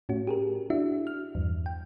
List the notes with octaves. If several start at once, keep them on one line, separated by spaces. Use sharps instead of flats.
A2 C#4 F#4
G4 G#4 A#4
D4 E4 F#4 E5
F6
E2 G2
G5